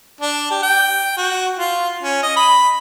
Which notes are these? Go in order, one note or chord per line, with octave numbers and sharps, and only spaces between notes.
D4
G4
G5
F#4
F4
C#4
D#5
B5